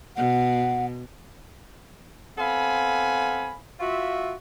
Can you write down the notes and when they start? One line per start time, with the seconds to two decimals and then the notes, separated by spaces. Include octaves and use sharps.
0.17 B2 F#5
2.38 B3 C4 A4 F5 G#5 B5
3.80 F4 F#4 E5